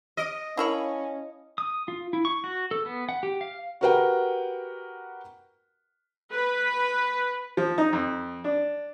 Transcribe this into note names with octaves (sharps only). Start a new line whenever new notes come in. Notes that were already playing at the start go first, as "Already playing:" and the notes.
D#5 F6 D7
C#4 E4 A#4 C#5 F5 A5 B5
D#6
F4
E4
C#6
F#4
A4
B3
F#5
G4
F5
F#4 G4 A#4 B4 F#5 G5
B4
F3
D#4
F2
D4